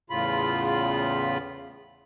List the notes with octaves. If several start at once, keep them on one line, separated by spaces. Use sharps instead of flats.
E2 A2 C#3 F4 B5